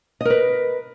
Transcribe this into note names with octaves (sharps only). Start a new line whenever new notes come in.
A#4 B4 D#5